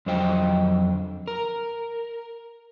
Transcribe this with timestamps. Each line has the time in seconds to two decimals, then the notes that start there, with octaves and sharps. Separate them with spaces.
0.06 F2 D3 F#3 C5 D#5 G5
1.28 A#4